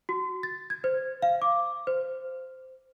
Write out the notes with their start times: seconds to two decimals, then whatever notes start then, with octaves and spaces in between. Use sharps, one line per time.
0.09 F#4
0.43 A6
0.70 G#6
0.84 C5
1.22 F5
1.42 D6
1.87 C5